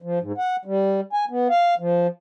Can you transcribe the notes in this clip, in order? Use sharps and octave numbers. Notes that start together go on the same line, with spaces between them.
F3
G#2
F#5
G3
G#5
B3
F5
F3